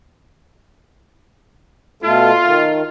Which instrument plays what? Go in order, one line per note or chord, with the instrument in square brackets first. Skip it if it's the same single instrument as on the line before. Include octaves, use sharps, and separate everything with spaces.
[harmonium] B2 A3 A4 [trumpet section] F4
[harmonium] D#3